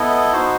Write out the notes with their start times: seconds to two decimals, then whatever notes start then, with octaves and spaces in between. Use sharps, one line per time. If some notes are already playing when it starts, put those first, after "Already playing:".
Already playing: B3 E4 A4 D#5
0.32 D#4 F#4 C5